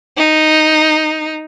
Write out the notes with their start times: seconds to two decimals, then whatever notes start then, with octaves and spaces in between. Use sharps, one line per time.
0.17 D#4